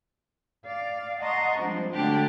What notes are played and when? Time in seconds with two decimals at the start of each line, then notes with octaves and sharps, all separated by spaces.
0.65 D5 F5
1.20 D#5 F#5 A5 A#5 C6 C#6
1.59 F3 G3 G#3 C4 D4
1.93 D3 F#3 G#3 A3 D4 G4